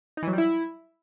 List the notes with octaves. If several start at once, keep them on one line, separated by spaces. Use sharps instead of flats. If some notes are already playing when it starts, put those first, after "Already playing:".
D#4
E3
F#3
G3
E4